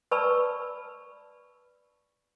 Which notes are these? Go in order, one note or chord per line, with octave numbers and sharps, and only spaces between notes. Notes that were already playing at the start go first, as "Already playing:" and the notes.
B4 D5 A5 B5 C#6 E6